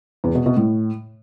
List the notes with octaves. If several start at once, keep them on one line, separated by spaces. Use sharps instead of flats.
E2
B2
B2
A2